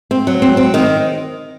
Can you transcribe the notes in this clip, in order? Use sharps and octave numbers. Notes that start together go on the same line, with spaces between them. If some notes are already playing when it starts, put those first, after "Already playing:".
C4
F#3
C4
C4
D#3